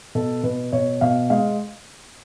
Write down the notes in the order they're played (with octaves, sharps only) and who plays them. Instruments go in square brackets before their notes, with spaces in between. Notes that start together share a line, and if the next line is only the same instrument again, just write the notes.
[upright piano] B2 A4
B2 B4
B2 C#5
B2 F5
G#3 F5